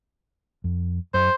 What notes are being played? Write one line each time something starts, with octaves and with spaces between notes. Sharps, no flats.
F2
F#2 C5